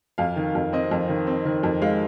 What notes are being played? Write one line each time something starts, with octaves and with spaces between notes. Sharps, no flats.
F2 F5
D#3
F2
C4 D#5
F2
D#3
C4
D#3
F2
G#3 F5